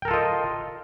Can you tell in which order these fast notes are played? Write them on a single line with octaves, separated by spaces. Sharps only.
G5 A#4 A4 F4 D#5